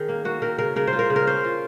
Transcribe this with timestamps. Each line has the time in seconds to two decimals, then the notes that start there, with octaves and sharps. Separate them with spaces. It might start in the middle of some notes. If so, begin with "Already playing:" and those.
Already playing: D#3 C#4 G#4
0.09 A#3
0.25 A#3 F#4
0.42 D#3 A#4
0.58 C#3 A#4
0.76 C#3 A#4
0.87 C5
0.93 F4
0.99 A#4
1.10 C#3
1.16 A#4
1.27 C#4 C5
1.45 F4